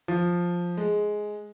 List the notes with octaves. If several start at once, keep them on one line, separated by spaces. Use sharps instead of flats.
F3
G#3